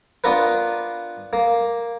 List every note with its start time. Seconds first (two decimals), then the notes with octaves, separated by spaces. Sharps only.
0.24 B3 D4 F4 A#4 B4
1.33 A#3